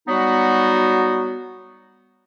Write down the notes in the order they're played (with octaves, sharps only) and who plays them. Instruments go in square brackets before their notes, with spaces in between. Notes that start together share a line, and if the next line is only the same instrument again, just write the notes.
[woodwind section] F#3 G3 B3 D#4 F#4